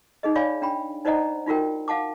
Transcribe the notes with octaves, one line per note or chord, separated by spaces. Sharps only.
D#4 G#4 D#5
C#5 D5 F5 G#5 B5
D4 G5 B5
D#4 C5 D5 D#5 F#5 A#5
D#4 F4 F#4 A#4 G5
F5 F#5 A5 D6